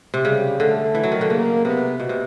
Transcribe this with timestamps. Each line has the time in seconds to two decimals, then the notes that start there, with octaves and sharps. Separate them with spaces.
0.14 C3
0.25 C#3 G3
0.59 D3 A3
0.95 E3
1.04 F#3
1.12 D#3
1.21 D3
1.30 C#3 A#3
1.65 C3 B3
2.00 B2
2.09 C3